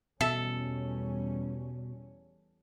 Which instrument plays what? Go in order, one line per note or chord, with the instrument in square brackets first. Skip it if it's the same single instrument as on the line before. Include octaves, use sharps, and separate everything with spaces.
[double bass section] E2 G3 C#4 [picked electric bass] B2 [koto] A4 [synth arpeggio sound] E5